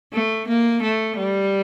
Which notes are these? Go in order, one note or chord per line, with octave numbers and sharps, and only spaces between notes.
A3
A#3
A3
G3